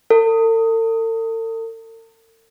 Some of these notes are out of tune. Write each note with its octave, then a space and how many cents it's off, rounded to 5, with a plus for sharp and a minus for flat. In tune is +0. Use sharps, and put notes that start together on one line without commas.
A4 +45